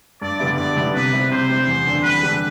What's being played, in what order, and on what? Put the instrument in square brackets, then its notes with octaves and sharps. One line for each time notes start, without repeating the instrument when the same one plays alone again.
[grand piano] G2 [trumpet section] D5
[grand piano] D3 G3 B3 E4
[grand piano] G2 [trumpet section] D5
[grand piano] D3 G3 B3 E4
[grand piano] C3 [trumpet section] B4
[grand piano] G3 C4 E4
[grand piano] C3 [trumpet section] C5
[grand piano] G3 C4 E4
E2
D3 G3 D4 A4
[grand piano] E2 [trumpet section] B4
[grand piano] D3 G3 D4 A4